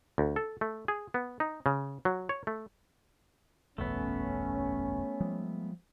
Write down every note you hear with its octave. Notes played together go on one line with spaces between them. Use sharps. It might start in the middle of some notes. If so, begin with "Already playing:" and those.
D2
A4
A3
G#4
B3
D#4
C#3
F#3
C#5
A3
F#1 B1 E2 A3 B3 C#4
F3 G3 G#3